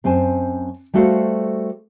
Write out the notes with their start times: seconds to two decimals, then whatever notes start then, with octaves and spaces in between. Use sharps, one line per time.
0.04 F#2 C4 C5 G#5 A5
0.94 G3 A3 F#4 A4 C5 F5